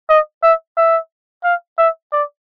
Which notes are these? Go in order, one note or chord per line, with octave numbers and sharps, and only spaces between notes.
D#5
E5
E5
F5
E5
D5